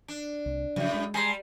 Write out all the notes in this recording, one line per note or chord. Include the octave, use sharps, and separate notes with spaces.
D4
C2
F#2 A2 C#3 F3 F#3
G#3
G3 G#4 A#5 C6